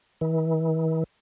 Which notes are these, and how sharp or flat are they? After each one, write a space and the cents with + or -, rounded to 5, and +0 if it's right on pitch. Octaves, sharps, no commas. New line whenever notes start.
E3 -40